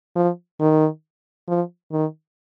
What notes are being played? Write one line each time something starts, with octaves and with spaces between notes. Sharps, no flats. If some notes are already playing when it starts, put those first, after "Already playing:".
F3
D#3
F3
D#3